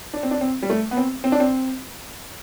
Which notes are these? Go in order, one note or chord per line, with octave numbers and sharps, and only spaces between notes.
D4
C4
D4
C4
G3
A3
B3
C4
C4
D4
C4